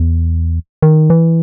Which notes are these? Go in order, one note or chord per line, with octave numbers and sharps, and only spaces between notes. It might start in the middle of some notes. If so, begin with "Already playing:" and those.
Already playing: E2
D#3
E3